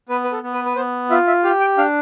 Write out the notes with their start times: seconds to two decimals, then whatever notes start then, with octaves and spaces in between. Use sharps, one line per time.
0.09 B3 B4
0.24 B4
0.32 A4
0.44 B3
0.54 B4
0.66 B4
0.76 B3 C5
1.10 F4 E5
1.28 E5
1.44 G4 F5
1.61 G5
1.78 D4 F5